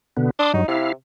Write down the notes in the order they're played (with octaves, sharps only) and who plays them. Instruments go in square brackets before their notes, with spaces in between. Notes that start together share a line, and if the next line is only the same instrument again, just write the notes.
[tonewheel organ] B2 D3 B3
[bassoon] D4 [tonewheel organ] C6 D6 D#6
[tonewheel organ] G2 F#3 [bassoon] D#4
[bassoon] C3 [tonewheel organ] E4 F5